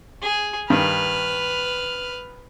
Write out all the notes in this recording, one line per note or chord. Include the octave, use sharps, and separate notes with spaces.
G#4
G2 D#3 B4 F6